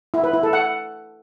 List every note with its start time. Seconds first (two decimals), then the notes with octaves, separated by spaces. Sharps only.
0.14 E4
0.24 B4
0.33 E4
0.43 A4
0.53 F#5